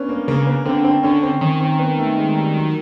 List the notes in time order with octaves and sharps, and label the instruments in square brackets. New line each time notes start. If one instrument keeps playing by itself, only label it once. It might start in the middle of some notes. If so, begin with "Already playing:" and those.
Already playing: [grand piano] B3 C#4 D4
A#3
[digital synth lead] C#3 [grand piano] A#3
[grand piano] B3
[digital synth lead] D3 [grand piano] C4
[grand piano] C4
[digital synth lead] D3 [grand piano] C#4
[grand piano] C4
[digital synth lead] D#3 [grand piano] C#4
[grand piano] C4
B3
A3
G#3
G3
F#3